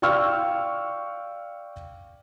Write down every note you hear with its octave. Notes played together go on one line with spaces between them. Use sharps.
D5 F5 G5 C#6 E6 F6